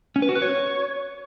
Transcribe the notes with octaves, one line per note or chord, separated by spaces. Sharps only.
C#4
B4
F#4
B4
C#5